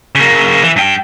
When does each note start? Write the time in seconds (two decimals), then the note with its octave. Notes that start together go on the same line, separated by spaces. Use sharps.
0.15 C#3 A#3
0.62 E3
0.76 G2 G5